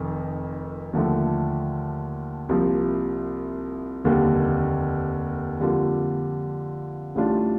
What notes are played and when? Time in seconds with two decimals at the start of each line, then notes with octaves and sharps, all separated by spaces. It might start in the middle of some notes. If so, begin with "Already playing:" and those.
Already playing: F1 F2 D#3
0.93 D#2 D3 F3 A3
2.49 C2 C3 F3 A#3
4.04 F1 D#2 D3 G3 A#3
5.60 F2 D3 G3 A#3 F4
7.15 A1 A2 G3 D4 F4